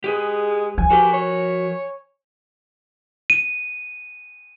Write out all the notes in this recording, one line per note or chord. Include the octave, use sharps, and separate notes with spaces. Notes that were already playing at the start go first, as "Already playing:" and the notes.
G#3 G4 G#4 B4
F3 G#5
F#4 G4 A#4 B4
C#5
D#7